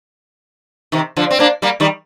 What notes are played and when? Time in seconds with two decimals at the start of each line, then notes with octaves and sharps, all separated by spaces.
0.92 C3 D#3
1.16 D3 F3
1.31 C4
1.39 A#3 D4
1.62 G3 A#3
1.80 D#3 G3